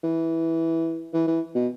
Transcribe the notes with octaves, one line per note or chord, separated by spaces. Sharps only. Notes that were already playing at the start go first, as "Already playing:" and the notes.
E3
E3
E3
B2